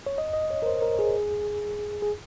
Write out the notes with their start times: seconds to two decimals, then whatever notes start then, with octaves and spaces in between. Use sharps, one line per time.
0.06 C#5
0.18 D#5
0.33 D#5
0.50 C#5
0.62 A#4
0.66 C5
0.82 A#4
0.99 G#4
2.02 G#4